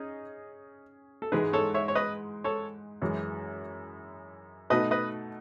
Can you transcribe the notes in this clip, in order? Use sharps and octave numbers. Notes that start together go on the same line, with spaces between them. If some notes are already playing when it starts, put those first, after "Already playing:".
Already playing: C#4 D#4 G#4
A4
G#2 E3 G#3 D#4 G#4 B4
A4 C#5
C#5 E5
C#5
B4 D#5
A4 C#5
F#2 E3 G#3
B2 A3 D#4 B4 D#5
B4 D#5